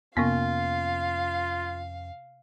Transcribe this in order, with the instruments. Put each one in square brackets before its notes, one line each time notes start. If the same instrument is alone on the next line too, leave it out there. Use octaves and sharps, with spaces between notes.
[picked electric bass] F2 C#4 [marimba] C3 A#3 B3 [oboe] F4 [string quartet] F5